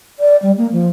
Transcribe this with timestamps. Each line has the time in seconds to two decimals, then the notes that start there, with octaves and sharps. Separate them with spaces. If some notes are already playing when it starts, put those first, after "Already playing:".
0.19 D5
0.42 G3
0.57 A#3
0.72 F3